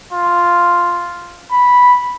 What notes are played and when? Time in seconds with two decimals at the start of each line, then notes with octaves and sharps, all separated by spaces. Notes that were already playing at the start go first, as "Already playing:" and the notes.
0.13 F4
1.52 B5